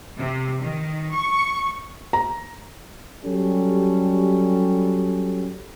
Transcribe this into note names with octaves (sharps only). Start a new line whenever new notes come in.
C3
D#3
C#6
A#5
F#3 G3 C#4 G4 A4